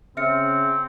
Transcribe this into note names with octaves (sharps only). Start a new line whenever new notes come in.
C#3 C4 E5 F6 C#7